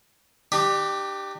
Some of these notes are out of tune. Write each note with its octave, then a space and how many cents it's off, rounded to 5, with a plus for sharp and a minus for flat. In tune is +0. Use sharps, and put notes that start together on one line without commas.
D4 +40 G4 +0